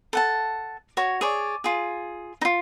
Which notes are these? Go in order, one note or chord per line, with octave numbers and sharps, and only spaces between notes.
A4 F#5 A5
F#4 C#5
G#4 C#5 D5
F4 G#4
D#4 F4